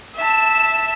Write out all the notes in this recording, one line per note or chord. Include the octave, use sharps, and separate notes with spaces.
E5 A5